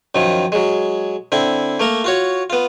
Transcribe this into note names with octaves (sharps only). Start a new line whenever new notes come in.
F#2 D#3 F3
F#3 G#3
D3 C4 E4
A3 A#3 A#4
F4 F#4 C#5
B3 F4